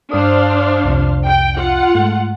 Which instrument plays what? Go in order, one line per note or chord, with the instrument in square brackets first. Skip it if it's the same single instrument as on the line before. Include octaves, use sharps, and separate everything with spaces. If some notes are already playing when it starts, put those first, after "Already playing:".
[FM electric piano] G2 D#6 [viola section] D4 C5 F5
[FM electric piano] C2 F2 C3
[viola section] G5
F4 F#5
[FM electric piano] G#2 A3